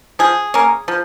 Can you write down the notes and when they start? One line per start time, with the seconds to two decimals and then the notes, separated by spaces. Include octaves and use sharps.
0.19 F3 G#4
0.54 A#3 C#4
0.88 F3